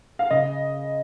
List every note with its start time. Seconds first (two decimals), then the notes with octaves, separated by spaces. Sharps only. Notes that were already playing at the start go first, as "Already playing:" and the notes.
0.19 F5
0.31 C#3 D#5